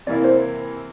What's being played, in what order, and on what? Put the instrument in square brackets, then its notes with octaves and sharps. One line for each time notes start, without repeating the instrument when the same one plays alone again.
[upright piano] C3 E3 A#3 E4 [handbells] D5
[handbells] C5